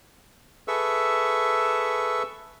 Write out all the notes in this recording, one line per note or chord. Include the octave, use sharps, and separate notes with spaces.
G#4 A4 B4 E5 C#6 E6